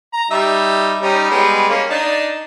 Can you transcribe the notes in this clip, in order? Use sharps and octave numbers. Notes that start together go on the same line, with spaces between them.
A#5
G3 D#4 E5
G3 C#4 D#4
G3 G#3 B3
A#3 C#4
D4 D#4 A5